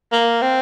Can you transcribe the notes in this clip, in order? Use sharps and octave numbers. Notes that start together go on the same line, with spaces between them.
A#3
C4